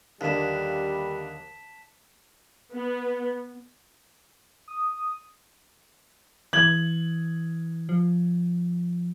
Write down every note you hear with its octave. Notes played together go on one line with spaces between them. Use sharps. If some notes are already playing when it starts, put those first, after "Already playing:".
D#2 D3 G3 A#3 D4 A5 B6 E7
B3
D#6
E3 G#6 F#7
F3